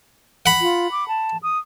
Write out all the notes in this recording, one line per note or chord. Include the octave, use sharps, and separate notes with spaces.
F#5 B5
F4
D6
A5
D#6